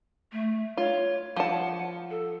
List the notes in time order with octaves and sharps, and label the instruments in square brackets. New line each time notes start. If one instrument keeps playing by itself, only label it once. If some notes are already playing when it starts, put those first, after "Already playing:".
[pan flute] A3
[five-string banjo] F4 [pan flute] C#5
[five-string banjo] F3 A5 [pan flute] F#5
[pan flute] A4